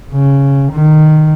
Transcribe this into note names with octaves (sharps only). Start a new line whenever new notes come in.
C#3
D#3